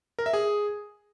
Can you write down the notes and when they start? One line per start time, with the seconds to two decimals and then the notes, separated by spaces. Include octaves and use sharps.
0.19 A#4
0.26 E5
0.33 G#4